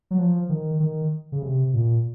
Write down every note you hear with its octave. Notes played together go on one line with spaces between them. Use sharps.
F#3
F3
D#3
D#3
C#3
C3
A#2